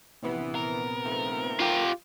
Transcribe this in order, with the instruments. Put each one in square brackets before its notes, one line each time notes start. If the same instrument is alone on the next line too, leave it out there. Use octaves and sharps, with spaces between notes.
[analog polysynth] A#1 C3 B3 [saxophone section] E3
[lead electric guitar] A#4
[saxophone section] D#3 F3 A3
[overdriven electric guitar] F4 G4